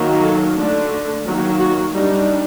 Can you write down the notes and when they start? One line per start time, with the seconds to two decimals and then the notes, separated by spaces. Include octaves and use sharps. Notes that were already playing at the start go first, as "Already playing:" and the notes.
Already playing: D#3 F#3 A#3
0.23 A4
0.57 D3 A3 D4
1.26 D#3 F#3 A#3
1.60 F#4
1.94 G3 D4 D#4